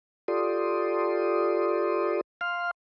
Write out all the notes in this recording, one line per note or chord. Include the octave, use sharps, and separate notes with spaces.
F4 G4 A4 D5 C6 D#6
F5 C6 F6